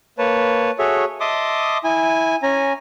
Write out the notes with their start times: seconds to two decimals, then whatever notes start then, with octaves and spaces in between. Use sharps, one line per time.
0.18 A#3 B4 C#5 A5
0.79 F#4 G#4 A4 C#5 E5
1.20 D#5 E5 A5 C6 D6 D#6
1.84 E4 G#5
2.43 C#4 G#5 A#5